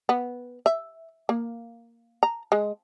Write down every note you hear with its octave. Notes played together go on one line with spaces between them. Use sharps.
B3
E5
A#3
A#5
G#3